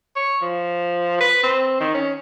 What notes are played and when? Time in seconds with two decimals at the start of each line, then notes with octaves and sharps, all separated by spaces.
0.16 C#5
0.42 F3
1.20 B4
1.43 C4
1.80 D#3
1.94 C#4